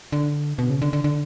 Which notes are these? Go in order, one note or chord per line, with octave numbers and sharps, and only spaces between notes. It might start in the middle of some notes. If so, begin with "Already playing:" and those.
D3
B2
C#3
D3
D3
D3